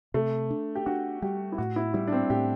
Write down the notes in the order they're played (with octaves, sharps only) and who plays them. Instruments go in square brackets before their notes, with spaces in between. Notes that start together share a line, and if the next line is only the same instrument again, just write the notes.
[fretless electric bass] C3 [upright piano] A3
[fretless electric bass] D4
[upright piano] G4
[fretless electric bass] D4 [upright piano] F#4
[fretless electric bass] G3 [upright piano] G4
[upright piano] E4
[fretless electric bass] A2 [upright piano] F#4
[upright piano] E4
[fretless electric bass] G3 [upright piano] E4
[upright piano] D4
C4
[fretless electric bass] A2 [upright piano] G4